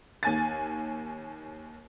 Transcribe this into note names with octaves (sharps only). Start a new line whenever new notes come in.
D#2 G#5 A6